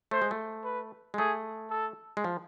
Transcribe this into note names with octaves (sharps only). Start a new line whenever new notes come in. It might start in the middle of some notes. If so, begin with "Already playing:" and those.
A3 C5
G#3
A3
B4
G#3
A3 G#4
A4
G#3
F3